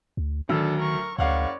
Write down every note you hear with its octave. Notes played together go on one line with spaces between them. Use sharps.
D2
D2 D#3 F#3 D4 A4 E6
A#4 C#6
F#1 D2 C#5 D5 F5 F#5